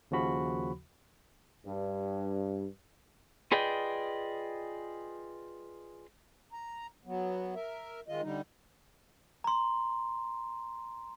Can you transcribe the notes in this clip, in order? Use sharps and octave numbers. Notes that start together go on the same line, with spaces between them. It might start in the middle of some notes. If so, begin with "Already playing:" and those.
D#2 C#3 F3 F#4 B5
G2
F4 G#4 B4 D5 D#5 G5
A#5
F#3 B3
A#4 E5
D#3 G#3 F4 D#5
D3 G3 D#4
A#5 C6